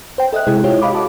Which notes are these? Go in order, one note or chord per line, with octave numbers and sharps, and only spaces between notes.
C5 G5
A4 D#5 E5 F#6
C3 G#3 E4 G#4
E4 F4 G4 C#5
D#5 F5 B5 D6
F#4 A5 D6